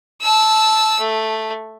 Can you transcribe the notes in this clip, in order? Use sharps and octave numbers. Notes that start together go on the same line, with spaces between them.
A5 E6
A3